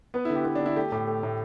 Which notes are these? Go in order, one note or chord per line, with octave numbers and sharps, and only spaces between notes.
B3 B4
E4
D3
G4
B3 E4
D4
D3
E4
A3 G4
A2 G4
A3
A2